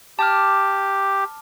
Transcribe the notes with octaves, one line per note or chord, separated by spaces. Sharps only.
G4 A5 D6 F6